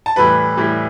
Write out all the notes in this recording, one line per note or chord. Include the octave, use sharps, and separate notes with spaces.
A5
A2 E3 G3 B4 B5
A2 E3 G3